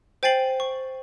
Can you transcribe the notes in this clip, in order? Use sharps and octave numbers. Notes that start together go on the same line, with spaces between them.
C5 G5 G#5 A6 C7 F#7
C#6